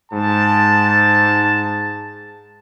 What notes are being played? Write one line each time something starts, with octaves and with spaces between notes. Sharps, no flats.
G#2 A5